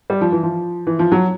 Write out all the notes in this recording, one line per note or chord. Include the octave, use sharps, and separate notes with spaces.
G3
F3
E3
F3
E3
F3
F#3